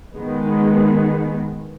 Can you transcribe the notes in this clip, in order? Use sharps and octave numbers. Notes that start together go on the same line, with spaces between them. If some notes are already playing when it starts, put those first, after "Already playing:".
D#3 G#3 B3